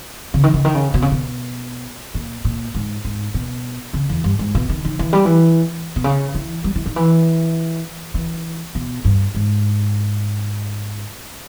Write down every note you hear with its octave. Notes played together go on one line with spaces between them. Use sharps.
C#3
D#3
C#3
D#3
C#3
B2
C#3
B2
A#2
A#2
G#2
G#2
B2
C#3
E2
G2
G#2
B2
D#3
D#3
E3
G3
E3
B2
C#3
E3
G3
E3
D#3
E3
E3
B2
G2
G#2